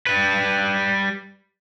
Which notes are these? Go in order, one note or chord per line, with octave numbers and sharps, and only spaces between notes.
G3 B4